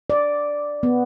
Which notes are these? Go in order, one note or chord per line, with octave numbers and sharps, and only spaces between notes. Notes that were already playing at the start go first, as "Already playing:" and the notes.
D5
B3